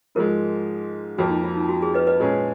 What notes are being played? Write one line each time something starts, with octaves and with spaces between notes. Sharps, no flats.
G#2 F3 G#3 A#4
F2 F3 A#3 F#4
D#4
F4
D#4
F#4
G#4
B4 D#5
B4 D#5
A#2 G#3 C#4 G#4